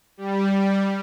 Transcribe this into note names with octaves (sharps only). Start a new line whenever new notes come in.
G3